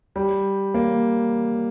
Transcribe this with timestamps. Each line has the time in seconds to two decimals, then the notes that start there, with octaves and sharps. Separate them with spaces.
0.16 G3
0.74 A#3